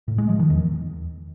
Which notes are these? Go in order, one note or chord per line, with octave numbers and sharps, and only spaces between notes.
A2
G#3
F3
D#3
E2